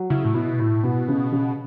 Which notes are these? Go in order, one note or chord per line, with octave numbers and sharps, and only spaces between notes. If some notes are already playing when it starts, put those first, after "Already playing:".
Already playing: F#3
C#3 E4
A2
B2 E4
A2 E4
B2 B3
C#3
C#3